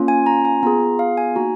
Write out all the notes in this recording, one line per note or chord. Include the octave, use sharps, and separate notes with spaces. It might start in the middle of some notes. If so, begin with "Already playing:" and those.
Already playing: A#3 C#4 F4
G#5
A#5
G#5
B3 F4 G#4 A#5
F5
G#5
A#3 D#4 F#4 A#5